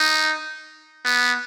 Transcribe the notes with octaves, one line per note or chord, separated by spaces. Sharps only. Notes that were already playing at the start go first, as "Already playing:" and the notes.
Already playing: D#4
B3